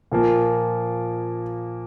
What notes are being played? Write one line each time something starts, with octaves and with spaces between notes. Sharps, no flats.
A#2 F3 A#3